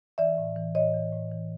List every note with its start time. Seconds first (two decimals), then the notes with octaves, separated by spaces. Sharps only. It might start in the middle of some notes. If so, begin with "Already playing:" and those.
0.18 E3 D5 E5
0.38 A2
0.56 E3
0.75 A2 C#5 D#5
0.94 E3
1.13 A2
1.31 E3